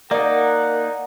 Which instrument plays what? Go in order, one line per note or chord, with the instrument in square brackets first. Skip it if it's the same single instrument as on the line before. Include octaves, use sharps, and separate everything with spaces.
[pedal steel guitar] A#3 D#4 [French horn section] A#4 [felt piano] D5 [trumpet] F#5